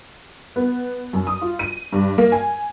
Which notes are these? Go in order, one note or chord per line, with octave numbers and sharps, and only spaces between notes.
B3
F#2
D#6
F4
D#7
G2
A#3
G#5